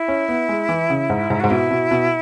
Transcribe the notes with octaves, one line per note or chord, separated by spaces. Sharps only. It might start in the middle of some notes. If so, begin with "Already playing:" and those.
Already playing: E4
C#4
B3
G#3
E3
C#3
G#2
G#2
G#2 F#4
B2 E4
B2
B2